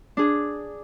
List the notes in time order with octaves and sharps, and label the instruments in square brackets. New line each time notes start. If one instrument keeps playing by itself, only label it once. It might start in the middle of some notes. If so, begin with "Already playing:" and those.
[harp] D4 G#4